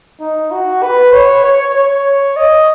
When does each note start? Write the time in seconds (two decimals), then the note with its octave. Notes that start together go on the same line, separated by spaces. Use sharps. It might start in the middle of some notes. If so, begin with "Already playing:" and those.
0.20 D#4
0.51 F#4
0.83 B4
1.13 C#5
1.44 C#5
1.74 C#5
2.36 D#5